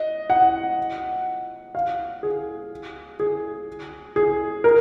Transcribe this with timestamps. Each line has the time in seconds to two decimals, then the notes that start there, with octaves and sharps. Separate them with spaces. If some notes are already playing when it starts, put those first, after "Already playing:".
Already playing: D#5
0.30 F#5
1.75 F5
2.23 G#4
3.20 G#4
4.16 G#4
4.64 A#4